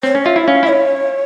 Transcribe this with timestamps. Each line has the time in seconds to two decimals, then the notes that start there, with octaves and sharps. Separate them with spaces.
0.03 C4 C#5
0.15 C#4
0.25 F4 E5
0.36 E4
0.48 C#4 F5
0.63 E4
0.69 C#5